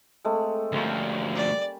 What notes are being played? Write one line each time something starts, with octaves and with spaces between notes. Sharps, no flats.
G#3 A3 C4
D2 F3 G3 A#3 C#4
D5